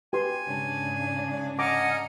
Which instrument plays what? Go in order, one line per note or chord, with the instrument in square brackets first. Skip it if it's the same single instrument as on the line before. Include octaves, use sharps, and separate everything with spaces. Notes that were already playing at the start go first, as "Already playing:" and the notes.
[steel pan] G4 B4 C6 [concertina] G#5
[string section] G#2 C#3 D4
[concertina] D#5 G#5 A#5 [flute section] F#5 F6 [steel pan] D6